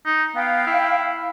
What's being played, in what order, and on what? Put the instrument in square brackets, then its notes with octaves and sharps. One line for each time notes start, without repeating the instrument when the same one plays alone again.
[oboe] D#4
[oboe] B3 [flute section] F5 G5
[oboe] E4